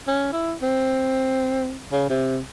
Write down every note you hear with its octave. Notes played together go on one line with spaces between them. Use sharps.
C#4
E4
C4
C#3
C3